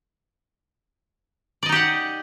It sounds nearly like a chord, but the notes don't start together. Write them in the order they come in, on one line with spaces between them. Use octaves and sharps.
D5 D#5 D#4 G4 F#5